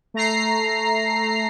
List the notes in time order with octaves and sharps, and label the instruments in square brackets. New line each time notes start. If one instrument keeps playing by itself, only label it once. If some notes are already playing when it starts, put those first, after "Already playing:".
[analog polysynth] A3 A#5 C7